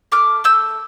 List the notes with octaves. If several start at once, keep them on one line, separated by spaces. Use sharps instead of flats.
A3 D6 F6
A3 E6 G6